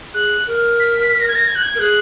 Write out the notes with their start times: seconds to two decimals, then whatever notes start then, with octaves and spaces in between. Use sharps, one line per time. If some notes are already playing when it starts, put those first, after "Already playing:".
0.14 G#4 F#6
0.47 A#4
0.80 B6
1.13 B6
1.21 A#6
1.28 G#6
1.35 A#6
1.47 G#6
1.55 F#6
1.63 G#6
1.75 A#4
1.80 G#4 F#6